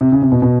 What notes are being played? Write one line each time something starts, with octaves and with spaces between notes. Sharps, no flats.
C3
C#3
C3
B2
B2